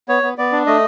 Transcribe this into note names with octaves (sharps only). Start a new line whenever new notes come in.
B3 C#5
B3
B3 D5
D4
A3 D#5